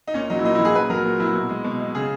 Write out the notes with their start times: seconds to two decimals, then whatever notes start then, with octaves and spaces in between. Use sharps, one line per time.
0.08 D#4
0.14 A#2 C#4
0.30 F#3 D#4
0.39 E4
0.44 A#2 D#4
0.55 E4
0.59 F#3
0.65 G#4
0.74 A#2 B4
0.90 F#3 A#4
1.05 A#2
1.20 F#3 E4
1.35 B2
1.49 G#3
1.64 B2
1.79 G#3
1.95 C#3 G#4